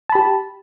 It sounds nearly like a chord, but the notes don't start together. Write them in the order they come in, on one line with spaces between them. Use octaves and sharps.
A5 B5 G4